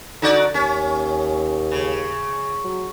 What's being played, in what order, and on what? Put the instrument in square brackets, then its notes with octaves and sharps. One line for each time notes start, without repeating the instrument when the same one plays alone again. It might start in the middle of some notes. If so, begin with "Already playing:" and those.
[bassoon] D3 [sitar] D#4 F#4 D5
[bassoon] D#2 [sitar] C#4
[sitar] C#3
[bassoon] F#3